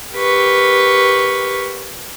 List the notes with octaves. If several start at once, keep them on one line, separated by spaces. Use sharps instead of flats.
G4 A#4 B4 C#6